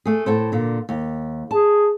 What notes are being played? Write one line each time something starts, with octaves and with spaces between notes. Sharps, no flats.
A3 G#4
A2 A4 C5
A#2 D3
D#2
G#4 A5